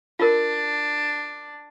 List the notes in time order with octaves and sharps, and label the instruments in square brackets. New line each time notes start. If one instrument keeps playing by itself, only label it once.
[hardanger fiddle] D4 [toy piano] F4 A#4